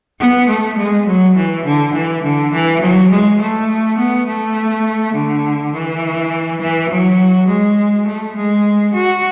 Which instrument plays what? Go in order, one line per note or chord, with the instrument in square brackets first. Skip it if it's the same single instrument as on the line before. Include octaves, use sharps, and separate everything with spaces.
[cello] B3
A3
G#3
F#3
E3
D3
E3
D3
E3
F#3
G#3
A3
B3
A3
D3
E3
E3
F#3
G#3
A3
G#3
F#4